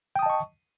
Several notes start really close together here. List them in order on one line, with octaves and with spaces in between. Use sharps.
G5 D#6 A5 D#5 C#6